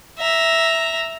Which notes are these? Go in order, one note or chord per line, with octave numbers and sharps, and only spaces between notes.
E5 A#5